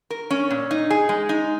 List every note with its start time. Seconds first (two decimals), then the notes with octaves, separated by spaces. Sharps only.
0.10 A#4
0.30 C#4
0.50 A#2
0.71 D#4
0.90 G#4
1.09 G#3
1.29 D#4